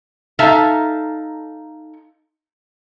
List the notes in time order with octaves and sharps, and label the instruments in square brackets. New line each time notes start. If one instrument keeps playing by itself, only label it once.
[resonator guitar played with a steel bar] D#4 A4 E5 F5 A5 A#5